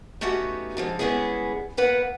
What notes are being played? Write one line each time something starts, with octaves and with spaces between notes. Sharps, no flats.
A3 B3 C#4 D#4 F#4 G4
D3 F3 G#3
G3 G#3 B3 C#4 E4 G#4
A#3 B3 B4 F#5